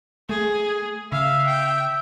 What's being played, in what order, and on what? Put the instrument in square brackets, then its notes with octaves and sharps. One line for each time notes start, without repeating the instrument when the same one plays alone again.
[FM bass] A3 [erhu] G#4
[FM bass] C#3 [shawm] E5 [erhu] F5
[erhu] G5